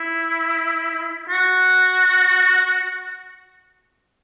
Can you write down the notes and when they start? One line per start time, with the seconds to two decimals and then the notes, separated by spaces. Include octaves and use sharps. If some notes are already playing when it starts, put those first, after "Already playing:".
Already playing: E4
1.29 F#4